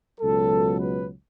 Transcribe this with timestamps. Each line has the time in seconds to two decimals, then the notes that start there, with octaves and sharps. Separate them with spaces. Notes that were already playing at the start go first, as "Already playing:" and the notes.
0.20 C#2 B2 F#3 A4
0.78 B4